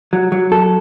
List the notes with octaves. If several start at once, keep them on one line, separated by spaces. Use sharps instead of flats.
F#3
F#3
A4